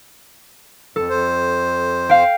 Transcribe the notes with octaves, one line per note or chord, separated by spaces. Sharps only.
F2 A4
F2 C5
F5 G5